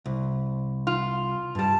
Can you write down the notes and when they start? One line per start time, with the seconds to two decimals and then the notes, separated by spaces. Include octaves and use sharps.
0.06 C2
0.87 F4
1.55 G2 G3 A5